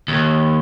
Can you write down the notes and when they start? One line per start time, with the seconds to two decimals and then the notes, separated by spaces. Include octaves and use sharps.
0.08 D#2